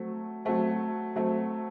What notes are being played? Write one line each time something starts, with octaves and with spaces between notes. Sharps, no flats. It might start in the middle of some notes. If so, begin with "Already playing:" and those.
Already playing: F#3 A3 C4
F#3 A3 C4
F#3 A3 C4